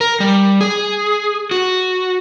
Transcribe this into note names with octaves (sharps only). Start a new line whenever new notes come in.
A#4
G3
G#4
F#4